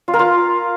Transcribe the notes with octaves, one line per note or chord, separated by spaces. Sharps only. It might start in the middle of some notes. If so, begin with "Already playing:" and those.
F4
A#4
F4